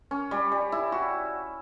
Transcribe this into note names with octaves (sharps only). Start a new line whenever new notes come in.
C#4
G3
G3
E4
F#4